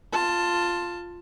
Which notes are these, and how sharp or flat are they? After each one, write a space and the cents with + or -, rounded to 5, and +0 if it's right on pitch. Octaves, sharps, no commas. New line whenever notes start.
F4 +0 A5 +10